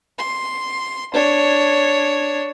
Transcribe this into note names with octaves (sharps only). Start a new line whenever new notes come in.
C6
D4 C#5